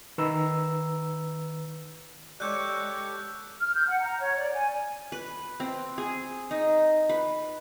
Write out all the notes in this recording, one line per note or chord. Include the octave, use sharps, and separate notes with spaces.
D#3 B4 A#5 E6
G#3 G4 A4 C#5 D5 D6 F#6 G6
F6
G6
F#5
A#5
C#5
D5
G#5
B4
C4
G#4
D#4
B4